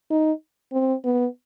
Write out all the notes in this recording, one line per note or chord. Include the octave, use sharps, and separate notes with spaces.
D#4
C4
B3